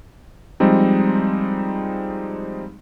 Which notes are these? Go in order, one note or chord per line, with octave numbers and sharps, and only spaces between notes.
F3 G3 G#3 C4 D#4